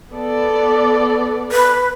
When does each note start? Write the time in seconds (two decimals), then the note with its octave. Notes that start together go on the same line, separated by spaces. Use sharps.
0.13 B3 A4 D5
1.52 B4